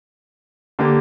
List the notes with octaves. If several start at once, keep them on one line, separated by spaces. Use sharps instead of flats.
D3 A#3 G4